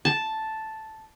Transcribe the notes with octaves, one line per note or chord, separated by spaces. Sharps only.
A5